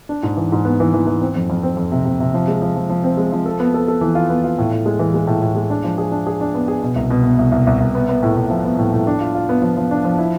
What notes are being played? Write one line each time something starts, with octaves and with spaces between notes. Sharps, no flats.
D4
G#2
E3
G#2
B3
E3
E3
E3
C4
F2
F2
C4
F2
C3
C3
C3
F3
G#3
F3
F3
F3
C4
G#3
F3
A4
B3
A4
A4
E3
F4
B3
F4
A2
A2
G#3
E3
G#3
A2
A2
G#3
D4
F3
G#4
D4
G#4
D4
B3
G#4
B2
C2
B2
B3
C2
C2
C2
C2
B3
B3
A2
A2
F3
B3
A2
A2
D4
F4
F4
B3
F3
F3
D4
F3
E4